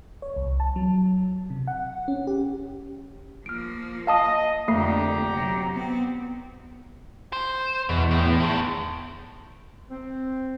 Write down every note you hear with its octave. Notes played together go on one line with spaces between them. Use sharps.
C#5
C2
A5
F#3
C3
F#5
C#4
G4
F3 A#3 F6 D7
D#5 F5 A5 D#6
F2 D3 A3 A#3 G4 A#5 C7
C3 F#3
B3 C4
C5
E2 B2
A2
D3 D#3
C4